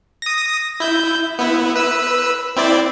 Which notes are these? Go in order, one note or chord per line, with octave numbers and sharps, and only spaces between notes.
D#6 A#6
E4 G6
B3 E4
B4 E6
C4 E4 D5